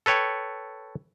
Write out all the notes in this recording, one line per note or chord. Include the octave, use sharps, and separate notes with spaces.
A4 B4 C#5 G5